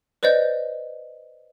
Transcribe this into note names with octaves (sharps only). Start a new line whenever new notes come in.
B4 C5 D5 D#5 G6